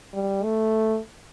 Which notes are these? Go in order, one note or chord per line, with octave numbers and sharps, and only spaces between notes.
G3
A3